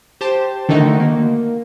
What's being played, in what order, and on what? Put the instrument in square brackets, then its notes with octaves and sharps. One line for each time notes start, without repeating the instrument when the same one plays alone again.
[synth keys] G4 C5 A5
D3 D#3 A3 D#4 F#4
A#3